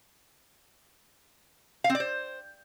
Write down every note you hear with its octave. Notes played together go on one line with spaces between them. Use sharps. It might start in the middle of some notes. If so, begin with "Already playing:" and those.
F5
C4
D5
C5